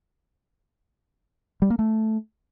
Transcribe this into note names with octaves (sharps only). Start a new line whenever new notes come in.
G3
A#3
A3